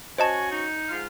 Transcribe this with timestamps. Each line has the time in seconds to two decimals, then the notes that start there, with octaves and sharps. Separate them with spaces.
0.18 C#4 F#4 C5 D#5 G#5 A5
0.51 D#4
0.89 G#2 F4 F5